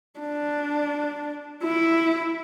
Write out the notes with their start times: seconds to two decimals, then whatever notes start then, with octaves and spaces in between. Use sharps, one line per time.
0.19 D4
1.63 E4